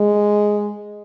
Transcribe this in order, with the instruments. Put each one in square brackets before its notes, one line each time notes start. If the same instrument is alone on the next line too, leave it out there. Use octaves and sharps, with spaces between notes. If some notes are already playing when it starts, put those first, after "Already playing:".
Already playing: [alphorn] G#3